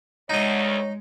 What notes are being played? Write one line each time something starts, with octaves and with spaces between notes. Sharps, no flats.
D2 G#3 D#4 C#5 D#5